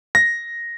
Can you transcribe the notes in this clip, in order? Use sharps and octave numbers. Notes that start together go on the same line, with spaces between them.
A#6